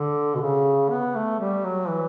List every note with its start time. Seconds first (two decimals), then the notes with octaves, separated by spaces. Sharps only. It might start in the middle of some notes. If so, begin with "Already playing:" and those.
Already playing: D3
0.35 B2
0.41 C#3
0.90 B3
1.15 A3
1.40 G3
1.64 F#3
1.88 E3